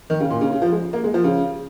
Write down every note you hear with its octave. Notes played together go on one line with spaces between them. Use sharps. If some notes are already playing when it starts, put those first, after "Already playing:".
D#3
C#3
A#2
C#3
C#3
F3
G#3
A#3
G#3
F3
C#3